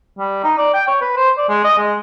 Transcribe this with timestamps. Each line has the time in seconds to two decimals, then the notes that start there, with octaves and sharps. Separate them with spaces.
0.18 G3
0.43 D#4
0.58 D5
0.73 G5
0.87 C#5
1.01 B4
1.16 C5
1.37 D5
1.49 G#3
1.64 D#5
1.77 G#3